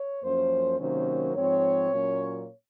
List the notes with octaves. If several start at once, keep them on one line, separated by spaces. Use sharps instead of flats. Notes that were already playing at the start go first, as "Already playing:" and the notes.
Already playing: C#5
F#2 F3 A#3 C#4 C5
C3 D#3 F#3 A#3 C#4 C5
G#2 F3 C4 C#5
A#2 F#3 A#3 C#4